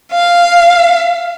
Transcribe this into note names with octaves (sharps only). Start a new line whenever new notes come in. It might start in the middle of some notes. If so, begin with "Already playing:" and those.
F5